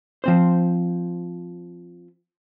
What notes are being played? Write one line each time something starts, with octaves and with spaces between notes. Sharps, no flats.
F3 C4 C5